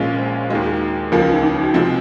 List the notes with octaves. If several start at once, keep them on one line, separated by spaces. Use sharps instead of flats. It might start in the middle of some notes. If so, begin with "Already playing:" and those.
Already playing: A#1 A#2 G#3 C#4 F4
C5
D#2 D#3 G#3 F#4
G#4
C#2 C#3 F3 A#3 F4
F4
D#4
D#4
F#4
C3 F3 G#3 C4 F4